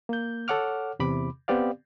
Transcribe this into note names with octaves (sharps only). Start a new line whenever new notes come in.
A#3 G6
A4 C#5 F#5 D6 F6
E2 C3 B5 D6
B3 C4 G4 D5 F5